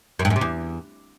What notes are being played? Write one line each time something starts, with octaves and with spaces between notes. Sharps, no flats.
F#2
G2
F#2
C3
E2